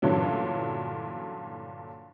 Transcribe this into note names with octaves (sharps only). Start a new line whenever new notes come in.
G2 A#2 D3 E3 F#3 C#4